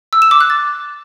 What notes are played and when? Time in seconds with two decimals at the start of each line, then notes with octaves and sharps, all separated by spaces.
0.13 E6
0.22 E7
0.31 D6
0.41 F#6
0.50 A6